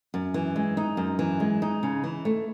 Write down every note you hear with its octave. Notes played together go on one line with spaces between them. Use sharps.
F#2
E3
G#3
D#4
F#2
E3
G#3
D#4
C#3
E3
A3